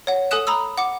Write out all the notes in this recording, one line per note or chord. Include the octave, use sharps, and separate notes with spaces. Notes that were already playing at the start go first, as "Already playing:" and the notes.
C#5 F#5
A4 G#5 D#6 F#6 E7
A#5 B5 D#6 E6
F#5 D6 C#7